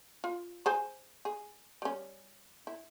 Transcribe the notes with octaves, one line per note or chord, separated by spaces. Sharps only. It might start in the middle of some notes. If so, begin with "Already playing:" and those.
F4
G#4 C5 G#5
G#4
G3 C#4
E4